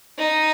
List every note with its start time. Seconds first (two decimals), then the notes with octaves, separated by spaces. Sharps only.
0.18 D#4